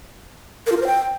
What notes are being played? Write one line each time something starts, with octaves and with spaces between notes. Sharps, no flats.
A#4
F4
A#4
C5
G5